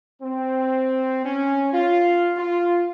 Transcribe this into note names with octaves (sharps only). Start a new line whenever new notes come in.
C4
C#4
F4
F4